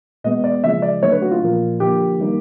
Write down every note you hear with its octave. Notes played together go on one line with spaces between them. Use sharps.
B2 G#3 B3 D#5
D5
C#3 F3 G#3 E5
D5
D3 F#3 A3 C#5
B4
F#4
F4
A#2 F3 A#3
D3 F3 A#3 G4
D#3 G3 A#3